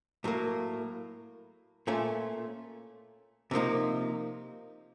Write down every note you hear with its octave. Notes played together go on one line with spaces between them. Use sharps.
A2 F#3 A#3
A#2 A3 C#4 F4
C3 F3 A#3 D#4